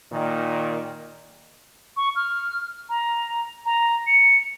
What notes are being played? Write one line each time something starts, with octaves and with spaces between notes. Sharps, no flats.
A#2 D#3
C#6
F6
A#5
A#5
C#7